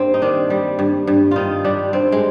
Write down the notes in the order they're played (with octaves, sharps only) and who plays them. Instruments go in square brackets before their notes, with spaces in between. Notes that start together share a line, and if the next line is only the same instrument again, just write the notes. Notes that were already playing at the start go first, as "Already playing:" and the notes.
Already playing: [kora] G2 A#3 C4
D#4
D#3 D4
G3
G2
G2
D#3 D#4 F4
G3 D4
G2 C4
G#3